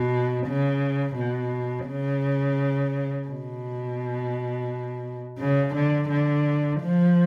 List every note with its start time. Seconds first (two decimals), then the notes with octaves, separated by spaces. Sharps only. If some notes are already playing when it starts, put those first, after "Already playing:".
Already playing: B2
0.47 C#3
1.16 B2
1.87 C#3
3.27 B2
5.39 C#3
5.75 D3
6.10 D3
6.80 F3